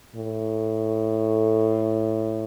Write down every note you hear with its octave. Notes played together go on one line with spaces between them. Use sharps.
A2